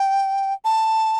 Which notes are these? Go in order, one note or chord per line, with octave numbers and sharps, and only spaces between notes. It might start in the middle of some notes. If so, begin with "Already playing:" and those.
Already playing: G5
A5